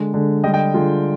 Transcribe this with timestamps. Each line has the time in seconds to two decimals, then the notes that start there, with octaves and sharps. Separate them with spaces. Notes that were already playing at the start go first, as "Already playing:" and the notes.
Already playing: D3 G#3
0.14 D3 G#3
0.44 D3 G3 D#5 G5
0.54 D#5 G5
0.74 D3 G3 F4 G#4